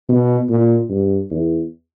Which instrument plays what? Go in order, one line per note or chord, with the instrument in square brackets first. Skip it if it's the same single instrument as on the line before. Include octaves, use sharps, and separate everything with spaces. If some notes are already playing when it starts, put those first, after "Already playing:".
[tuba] B2
A#2
G2
E2